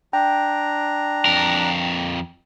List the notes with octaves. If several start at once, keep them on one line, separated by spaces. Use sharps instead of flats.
D4 G5 A#5
F2 A#4